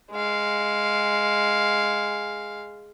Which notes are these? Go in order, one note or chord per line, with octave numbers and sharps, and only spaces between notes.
G#3 F5